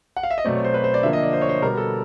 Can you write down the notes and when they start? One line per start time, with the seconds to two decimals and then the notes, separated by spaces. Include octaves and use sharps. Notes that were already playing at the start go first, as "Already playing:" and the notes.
0.17 F#5
0.23 F5
0.30 E5
0.38 D#5
0.44 B2 F#3 A3 C4 D5
0.55 C#5
0.64 C5
0.74 B4
0.84 C5
0.94 D5
1.03 D3 F3 A#3 E5
1.13 D#5
1.23 D5
1.33 C5
1.41 C#5
1.49 C5
1.62 B2 G3 B3 A#4
1.78 A4